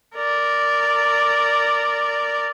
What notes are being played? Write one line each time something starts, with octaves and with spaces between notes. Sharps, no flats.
A#4 D5